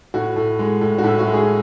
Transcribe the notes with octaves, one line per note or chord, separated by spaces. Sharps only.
A2 F#4
A2
G#3
A2
F#4
A2 E4
F#4
G#3
G#4